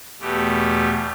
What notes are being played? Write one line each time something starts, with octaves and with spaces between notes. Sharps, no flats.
E2 B2 A3 G4